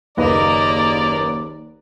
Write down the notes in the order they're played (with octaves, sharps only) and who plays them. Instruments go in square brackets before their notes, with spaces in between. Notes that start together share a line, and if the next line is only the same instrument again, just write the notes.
[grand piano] F#1 B4 D#5 [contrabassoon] D#2 [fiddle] A#3 A#4 [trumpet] D5